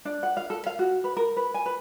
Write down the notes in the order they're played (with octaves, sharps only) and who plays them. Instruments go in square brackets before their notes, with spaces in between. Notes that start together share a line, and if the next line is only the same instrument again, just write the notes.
[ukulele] D4
F#5
F5
A4
F5
F#4
B4
A#4
B4
G#5
B4